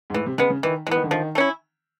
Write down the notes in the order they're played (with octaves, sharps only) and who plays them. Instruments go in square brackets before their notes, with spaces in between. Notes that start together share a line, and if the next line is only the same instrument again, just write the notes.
[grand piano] G#2
[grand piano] A2 [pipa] E3
[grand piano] C3
[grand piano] C#3 [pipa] G#3 B3
[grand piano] C#3
[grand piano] D#3 [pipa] E3
[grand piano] E3 [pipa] G#3
[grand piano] D#3 [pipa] B3
[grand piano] D3
[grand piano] D#3 [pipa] F3
[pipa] A3
C#4 E4